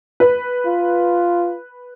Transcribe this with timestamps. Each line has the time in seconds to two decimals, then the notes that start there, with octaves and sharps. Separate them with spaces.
0.20 B4
0.66 F4